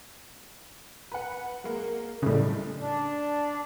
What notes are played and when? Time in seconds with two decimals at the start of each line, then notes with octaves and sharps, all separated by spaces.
1.12 B4 F#5
1.64 G#3 A#3 A#4
2.22 B1 A2 C#3 G3
2.79 D4